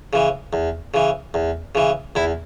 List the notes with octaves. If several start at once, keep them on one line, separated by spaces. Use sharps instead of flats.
C#3 E3
E2
C#3 E3
E2
C#3 E3
E2 E4